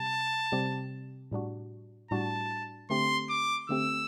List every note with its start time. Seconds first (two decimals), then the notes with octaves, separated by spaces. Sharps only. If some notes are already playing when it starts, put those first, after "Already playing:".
Already playing: C3 G3 A5
0.52 C3 G3 C4 G4
1.31 A2 G3 D4 F#4
2.11 A2 G3 D4 F#4 A5
2.90 D3 A3 C4 G4 C6
3.30 D6
3.69 D3 A3 C4 G4 E6